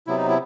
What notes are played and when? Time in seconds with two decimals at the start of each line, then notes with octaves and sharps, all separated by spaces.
0.07 C3 F#3 B3 E4
0.18 D#4
0.29 E4